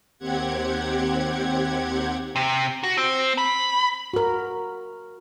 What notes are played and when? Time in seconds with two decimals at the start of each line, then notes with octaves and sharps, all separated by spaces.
0.19 D#2 C4 G4 F#5 G#6
2.36 C3
2.83 F#4
2.97 C4
3.38 B5
4.13 F#4 A#4